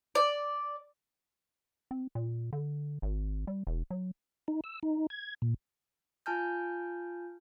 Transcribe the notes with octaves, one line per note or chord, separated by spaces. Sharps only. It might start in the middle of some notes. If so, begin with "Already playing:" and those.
D5
C4
A#2
D3
G#1
G3
E1
F#3
D#4
E6
D#4
G#6
A#2
F4 G#5 A5 F6 G6